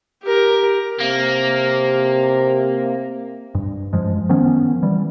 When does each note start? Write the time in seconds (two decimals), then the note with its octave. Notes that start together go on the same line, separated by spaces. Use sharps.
0.23 G4 A#4
1.00 C3 A#3
3.55 G2
3.93 F#2 F3 G#3
4.29 D#3 F3 B3 C#4
4.83 E3 G3